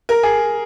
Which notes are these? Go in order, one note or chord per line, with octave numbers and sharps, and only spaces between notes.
A#4
G#4